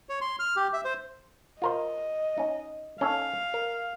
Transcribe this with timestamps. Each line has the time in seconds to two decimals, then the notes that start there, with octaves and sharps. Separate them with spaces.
0.09 C#5
0.21 C6
0.39 F6
0.56 G4
0.73 E5
0.85 C5
1.62 F4 A#4 C5 D#5
2.38 C#4 D#4
3.01 C#4 D#4 A4 F5
3.54 A#4